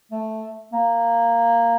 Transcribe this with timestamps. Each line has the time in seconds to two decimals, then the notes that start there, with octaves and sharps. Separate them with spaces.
0.12 A3
0.73 A#3